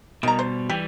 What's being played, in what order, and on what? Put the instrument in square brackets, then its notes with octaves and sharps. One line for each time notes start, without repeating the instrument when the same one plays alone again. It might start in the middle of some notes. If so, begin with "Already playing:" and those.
[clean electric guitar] B2 G3 [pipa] D#3 A#5
[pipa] C5
[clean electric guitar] E3 G3 [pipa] G4